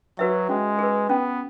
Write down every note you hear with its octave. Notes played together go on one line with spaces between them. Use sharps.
F#3 F#4 B4 E5
G#3 C#4
G#4 B4
B3 C#4